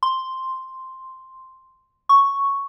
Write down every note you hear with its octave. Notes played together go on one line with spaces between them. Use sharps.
C6
C#6